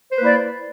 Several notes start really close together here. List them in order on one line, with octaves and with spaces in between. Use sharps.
C5 B4 A#3 E4 D5